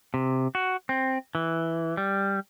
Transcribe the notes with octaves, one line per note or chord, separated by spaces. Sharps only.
C3
F#4
C4
E3
G3